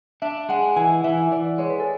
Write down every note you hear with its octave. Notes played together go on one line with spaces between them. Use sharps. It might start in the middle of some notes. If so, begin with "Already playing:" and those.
D4 E5
G#3 F#5
E3 G#5
E3 E5
E3 D5
G#3 C#5
B4
A4